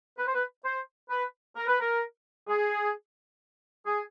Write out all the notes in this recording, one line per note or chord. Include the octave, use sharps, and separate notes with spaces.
B4
C5
B4
C5
B4
A#4
B4
A#4
G#4
G#4